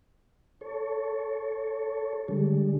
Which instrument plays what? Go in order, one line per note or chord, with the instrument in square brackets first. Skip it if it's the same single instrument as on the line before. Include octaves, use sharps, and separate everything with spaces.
[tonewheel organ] A4 C#5
D3 G3 G#3